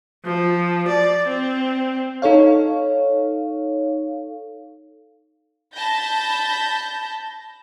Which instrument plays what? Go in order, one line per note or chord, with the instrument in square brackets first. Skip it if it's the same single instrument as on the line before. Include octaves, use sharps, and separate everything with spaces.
[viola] F3
D5
C4
[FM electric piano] D#4 A4 C#5 F5
[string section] A5 B5 G6 A#6